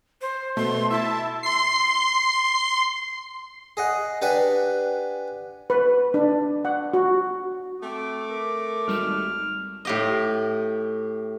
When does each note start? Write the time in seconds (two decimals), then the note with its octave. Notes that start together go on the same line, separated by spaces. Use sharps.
0.21 C5
0.56 B2 A3 C6
0.90 E4 E5 A5
1.43 C6 C7
3.77 G#4 D#5 F#5
4.22 D4 G4 B4 F#5 G#5
5.70 B4
6.14 D4
6.65 F#5
6.94 F#4
7.82 A3 C4 D6
8.30 A#4
8.88 G#1 G3 F6 E7
9.85 A2 G4 D#5